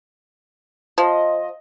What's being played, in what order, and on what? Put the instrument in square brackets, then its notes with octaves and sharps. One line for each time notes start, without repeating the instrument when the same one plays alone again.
[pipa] F3 [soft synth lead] D#5